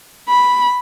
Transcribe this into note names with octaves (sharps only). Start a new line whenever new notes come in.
B5